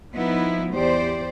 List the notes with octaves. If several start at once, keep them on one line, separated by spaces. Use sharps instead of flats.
F3 B3 D#4 E4
E2 G4 C5 D5